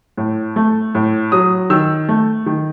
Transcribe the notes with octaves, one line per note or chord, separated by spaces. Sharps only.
A2
A3
A2
F#3 D#6
D#3 E6
A3
D#3